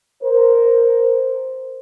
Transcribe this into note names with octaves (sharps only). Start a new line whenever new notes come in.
A#4 C5